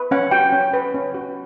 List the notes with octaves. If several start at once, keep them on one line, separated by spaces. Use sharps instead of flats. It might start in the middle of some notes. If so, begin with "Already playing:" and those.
Already playing: B4
C#4 F#5
F#4 G5
C#4
B4
C#4
F#4